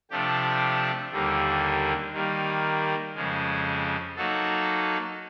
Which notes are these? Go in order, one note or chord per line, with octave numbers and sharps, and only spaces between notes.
C3 F3 A3 D4 G4
D#2 D3 G3 A#3
D#3 G3 A#3
F2 C#3 F3 G#3
F#3 A#3 D#4 F#4 A4